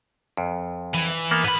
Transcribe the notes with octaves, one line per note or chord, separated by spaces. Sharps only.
F2
E3
A#3 B3
G#2 B4 B5